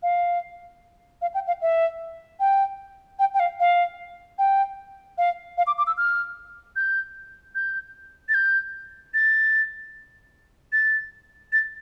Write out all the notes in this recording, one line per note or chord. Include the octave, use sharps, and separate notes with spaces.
F5
F5
G5
F5
E5
G5
G5
G5
F5
F5
G5
F5
F5
D6
D6
E6
F6
G6
G6
A6
G6
A6
A6
A6